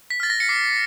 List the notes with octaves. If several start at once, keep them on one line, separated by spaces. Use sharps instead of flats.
B6
F6 A6
A#6
C#7
D6 C7